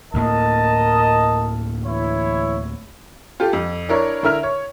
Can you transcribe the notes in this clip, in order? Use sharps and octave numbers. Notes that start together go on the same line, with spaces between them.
D2 A2 A#3 A#4 D#5 A5
E3 E4 C#5
F4 G4 A4 F5
F2
D4 E4 A#4 C#5
D3 E4 A#4 E5 F6 F7
C#5